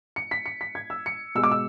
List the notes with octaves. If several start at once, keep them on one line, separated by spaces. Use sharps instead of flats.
C#7
B6
C#7
B6
G#6
E6
C#7
B2 G#3 E6
D6
E6